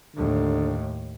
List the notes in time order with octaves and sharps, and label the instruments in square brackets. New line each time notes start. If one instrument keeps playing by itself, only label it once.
[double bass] D#2 A2 [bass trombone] D3